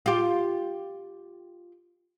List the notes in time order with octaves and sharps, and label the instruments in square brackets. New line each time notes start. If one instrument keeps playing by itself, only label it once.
[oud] F4 G4